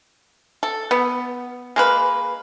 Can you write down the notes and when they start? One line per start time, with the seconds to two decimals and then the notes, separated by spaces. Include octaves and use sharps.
0.63 A4
0.91 B3
1.76 G#3 A#3 B4